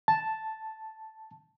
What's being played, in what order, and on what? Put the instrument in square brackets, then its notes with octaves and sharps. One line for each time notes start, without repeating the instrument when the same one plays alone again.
[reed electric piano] A5